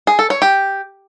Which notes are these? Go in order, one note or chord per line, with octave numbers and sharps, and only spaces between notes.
G#4
A4
C#5
G4